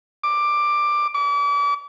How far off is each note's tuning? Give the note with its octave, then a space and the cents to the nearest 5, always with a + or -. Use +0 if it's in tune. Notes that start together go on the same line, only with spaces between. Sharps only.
D6 +10
D6 -40